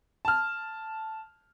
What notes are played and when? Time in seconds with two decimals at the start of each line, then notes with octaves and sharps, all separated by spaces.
0.25 A5 F6